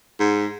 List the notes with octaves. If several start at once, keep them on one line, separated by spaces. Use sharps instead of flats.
G#2